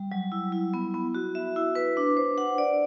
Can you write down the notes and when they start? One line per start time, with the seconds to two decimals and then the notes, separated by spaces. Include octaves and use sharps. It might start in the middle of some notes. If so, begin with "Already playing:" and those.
Already playing: G3
0.12 F#3
0.32 E4
0.52 E4
0.74 B3
0.94 B3
1.15 F#4
1.35 E5
1.56 E4
1.75 B4
1.97 D4
2.17 C5
2.38 F#5
2.58 D5